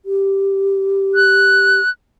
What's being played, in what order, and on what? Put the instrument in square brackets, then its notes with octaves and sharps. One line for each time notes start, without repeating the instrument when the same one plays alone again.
[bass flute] G4
[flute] F#6